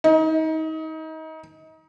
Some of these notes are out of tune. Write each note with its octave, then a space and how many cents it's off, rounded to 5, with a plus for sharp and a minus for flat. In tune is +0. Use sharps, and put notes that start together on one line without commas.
D#4 +30